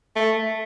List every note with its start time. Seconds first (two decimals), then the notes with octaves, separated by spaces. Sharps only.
0.16 A3